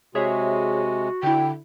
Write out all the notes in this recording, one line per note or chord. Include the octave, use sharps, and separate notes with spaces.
C3 G#3 F#4 G#4 C#5 E5
D3 E4 G5